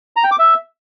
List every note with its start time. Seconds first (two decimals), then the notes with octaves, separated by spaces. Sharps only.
0.16 A#5
0.24 G5
0.31 D6
0.39 E5